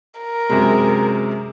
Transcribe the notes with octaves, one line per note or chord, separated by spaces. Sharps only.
A#4
F#2 C3 G#3